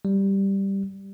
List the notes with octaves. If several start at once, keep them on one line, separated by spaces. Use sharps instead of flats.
G3